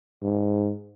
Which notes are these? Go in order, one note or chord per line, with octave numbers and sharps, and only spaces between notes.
G#2